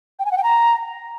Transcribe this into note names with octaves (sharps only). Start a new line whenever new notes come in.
G5
G#5
F#5
G5
A#5